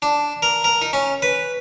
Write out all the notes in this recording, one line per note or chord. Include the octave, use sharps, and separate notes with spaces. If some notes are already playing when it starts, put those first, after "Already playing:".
D4
A#4
A#4
D#4
C#4
B4